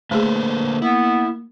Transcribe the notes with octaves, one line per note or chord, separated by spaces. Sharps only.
D3 A3 A#3 G#4 B4 C5
B3 E4